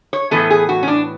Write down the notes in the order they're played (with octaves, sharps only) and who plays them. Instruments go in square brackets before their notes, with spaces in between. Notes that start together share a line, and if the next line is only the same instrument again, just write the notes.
[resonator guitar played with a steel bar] C#5
A2 E3 B3 A4
G#4
F#4
C#4
D4